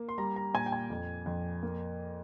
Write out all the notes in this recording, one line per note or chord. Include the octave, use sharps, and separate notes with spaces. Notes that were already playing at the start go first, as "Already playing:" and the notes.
Already playing: A#3
C6
G3 A#5
A#5
A#2 G#5
G5
G#5
F2
F2
A#3